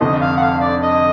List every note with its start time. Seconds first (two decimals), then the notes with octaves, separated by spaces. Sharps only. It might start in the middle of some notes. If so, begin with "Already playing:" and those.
0.01 F1 F2 D3 D#5
0.21 F5
0.36 F#5
0.42 F5
0.61 D5
0.82 D#5